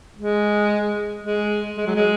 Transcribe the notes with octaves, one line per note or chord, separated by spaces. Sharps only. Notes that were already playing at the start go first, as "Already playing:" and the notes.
G#3
G#3
G#3
F#3
G#3